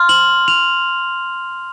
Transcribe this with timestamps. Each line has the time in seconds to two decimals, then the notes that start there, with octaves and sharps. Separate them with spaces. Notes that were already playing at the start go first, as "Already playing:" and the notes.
Already playing: C6 F6
0.09 F#7
0.48 F7